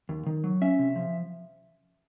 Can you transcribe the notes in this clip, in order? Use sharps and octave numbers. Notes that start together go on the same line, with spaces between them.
D#2
D#3
F#3
C#4 E5
C3
F3